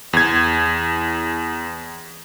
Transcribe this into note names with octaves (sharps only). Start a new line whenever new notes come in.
E2 G#6